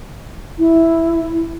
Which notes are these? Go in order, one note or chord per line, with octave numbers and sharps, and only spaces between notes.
E4